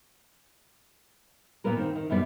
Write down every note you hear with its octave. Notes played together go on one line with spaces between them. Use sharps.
A#2 B3 C#4 A#4 B4
D#3 C4
D#3
F#2 B2 G3 B3 E4 D5